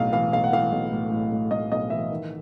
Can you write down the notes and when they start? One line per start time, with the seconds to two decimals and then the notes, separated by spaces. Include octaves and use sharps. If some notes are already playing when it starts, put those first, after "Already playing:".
Already playing: B1 A2 F5
0.12 E3 F5
0.32 B1 F5
0.44 F#5
0.53 E3 F5
0.72 B1
0.92 A2
1.11 A2
1.32 A2
1.51 A2 D#5
1.72 B1 D#5
1.90 E3 E5
2.11 D#3